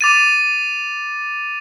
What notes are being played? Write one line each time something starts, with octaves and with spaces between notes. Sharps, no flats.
D6 A6 D#7